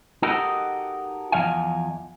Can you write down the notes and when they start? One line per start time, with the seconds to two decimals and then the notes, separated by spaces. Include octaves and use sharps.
0.22 D#4 F#4 G4 A4 A#4 D#5
1.32 E2 D#3 F3 D#5 F5 G#5